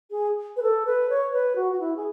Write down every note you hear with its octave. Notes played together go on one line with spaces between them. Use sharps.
G#4
B4
A4
B4
C#5
B4
F#4
F#4
E4
G#4